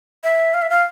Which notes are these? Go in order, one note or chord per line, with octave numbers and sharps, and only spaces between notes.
E5
F5
E5
F5